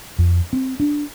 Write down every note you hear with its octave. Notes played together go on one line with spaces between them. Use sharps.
F2
C4
D4